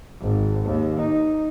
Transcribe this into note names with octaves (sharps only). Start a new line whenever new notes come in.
G#1
D#2
D#4